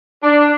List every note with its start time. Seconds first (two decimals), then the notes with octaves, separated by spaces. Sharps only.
0.23 D4